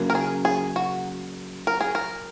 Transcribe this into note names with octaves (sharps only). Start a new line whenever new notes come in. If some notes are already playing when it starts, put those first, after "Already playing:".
Already playing: C#3 F#3 A#3
A#4
G#4
G#4
F#4
A#4
G#4
A#4